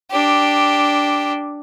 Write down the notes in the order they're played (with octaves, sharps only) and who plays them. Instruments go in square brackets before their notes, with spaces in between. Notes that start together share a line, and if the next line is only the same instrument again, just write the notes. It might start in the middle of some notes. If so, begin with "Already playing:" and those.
[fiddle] D4 G4